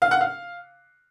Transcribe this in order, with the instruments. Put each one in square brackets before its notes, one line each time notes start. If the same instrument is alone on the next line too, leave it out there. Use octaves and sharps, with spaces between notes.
[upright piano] F5
F#5
F5